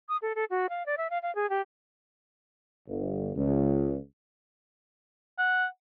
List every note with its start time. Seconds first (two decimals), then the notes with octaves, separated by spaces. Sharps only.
0.09 D#6
0.22 A4
0.35 A4
0.50 F#4
0.69 F5
0.86 D5
0.97 E5
1.10 F5
1.22 F5
1.35 G#4
1.50 G4
2.88 G1
3.36 C#2
5.38 F#5